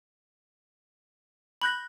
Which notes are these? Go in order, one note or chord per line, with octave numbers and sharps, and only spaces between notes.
B5 F#6 G6 A#6 F#7